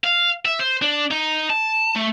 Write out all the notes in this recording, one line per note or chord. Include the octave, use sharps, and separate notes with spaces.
F5
E5
C5
D4
D#4
A5
A3